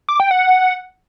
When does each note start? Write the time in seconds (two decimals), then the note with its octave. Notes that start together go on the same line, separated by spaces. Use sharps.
0.09 D6
0.20 G5
0.31 F#5